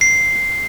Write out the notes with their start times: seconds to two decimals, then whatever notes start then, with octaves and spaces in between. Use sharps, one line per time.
0.01 C7